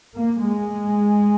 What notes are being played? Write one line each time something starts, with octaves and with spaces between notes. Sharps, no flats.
A#3
G#3